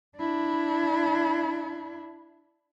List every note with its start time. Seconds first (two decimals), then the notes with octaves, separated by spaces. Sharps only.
0.17 D4 E4